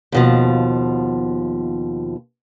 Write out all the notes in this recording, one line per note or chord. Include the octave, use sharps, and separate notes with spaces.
D#2 B2 F3